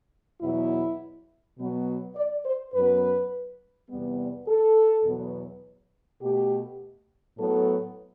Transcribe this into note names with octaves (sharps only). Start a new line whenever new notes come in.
E2 B2 F#3 B3 E4
B2 F#3 B3
D5
C5
F#2 F#3 B3 B4
E2 C3 G3 B3
A4
E2 B2 F#3 B3
B2 A3 G4
A2 F#3 B3 A4